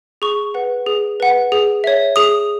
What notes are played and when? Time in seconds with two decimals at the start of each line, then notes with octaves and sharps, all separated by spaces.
0.22 G#4 C#6
0.54 B4 F#5
0.86 G#4
1.20 B4 F#5
1.52 G#4
1.84 C#5 E5
2.16 G#4 D#6